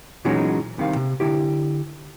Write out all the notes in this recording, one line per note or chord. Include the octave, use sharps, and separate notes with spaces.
A#2 E3 F#3 G#3 C#4 D#4
C2 C3 D#3 F5
C3
D3 E4 G4